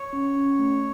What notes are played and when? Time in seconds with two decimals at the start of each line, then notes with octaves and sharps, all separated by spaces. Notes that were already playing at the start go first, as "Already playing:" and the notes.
Already playing: C#5
0.13 C#4
0.36 C#4
0.59 A3